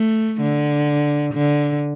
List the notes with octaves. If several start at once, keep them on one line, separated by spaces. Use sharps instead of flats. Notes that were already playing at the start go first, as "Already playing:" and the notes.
Already playing: A3
D3
D3